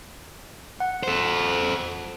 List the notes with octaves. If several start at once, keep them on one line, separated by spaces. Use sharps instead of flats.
F#5
A4 C5